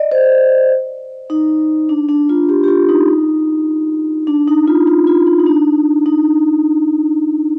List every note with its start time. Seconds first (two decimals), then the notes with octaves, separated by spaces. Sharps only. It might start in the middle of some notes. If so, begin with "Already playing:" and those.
Already playing: D5 D#5
0.11 C5
1.30 D#4
1.89 D4
2.09 D4
2.29 F4
2.49 G4
2.63 G4
2.68 F4
2.89 D#4
4.27 D4
4.48 D#4
4.68 F4
4.87 F4
5.07 F4
5.27 D#4
5.40 D#4
5.46 D4
6.06 D#4